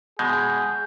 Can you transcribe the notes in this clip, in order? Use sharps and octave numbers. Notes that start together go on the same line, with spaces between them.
B2 G#3 G#4 G6